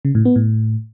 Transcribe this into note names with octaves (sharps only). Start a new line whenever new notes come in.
C#3
A2
B3
A2